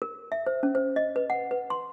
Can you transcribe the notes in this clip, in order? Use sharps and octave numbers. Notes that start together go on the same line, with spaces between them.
A#4
E5
C5
C#4
C5
D#5
B4
F#5
B4
C6